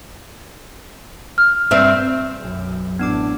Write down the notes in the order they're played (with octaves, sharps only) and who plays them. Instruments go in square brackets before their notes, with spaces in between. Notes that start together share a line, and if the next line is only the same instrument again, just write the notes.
[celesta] F6
[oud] G2 C4 E5
[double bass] B1 F#2
[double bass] A1 [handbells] B3 D4 D6